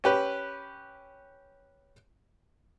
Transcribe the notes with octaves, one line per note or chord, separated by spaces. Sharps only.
C#4 G4 B4